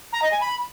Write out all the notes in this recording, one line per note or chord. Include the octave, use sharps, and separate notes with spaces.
A#5
D#5
G#5
B5